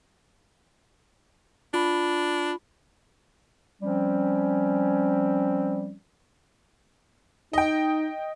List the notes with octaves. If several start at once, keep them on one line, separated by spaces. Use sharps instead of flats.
D4 F4 B5
F3 G3 C4 C#4
D#4 D#5 G5